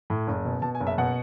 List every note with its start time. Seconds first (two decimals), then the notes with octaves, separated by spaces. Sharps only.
0.10 A2
0.27 F#1
0.45 B2
0.62 B2 A5
0.75 G#5
0.80 F#1
0.87 E5
0.98 B2 F#5